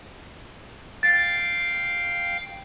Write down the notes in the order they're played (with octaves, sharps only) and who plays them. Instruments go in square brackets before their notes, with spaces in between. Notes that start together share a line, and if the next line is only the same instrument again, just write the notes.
[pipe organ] F5 G5 [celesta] A6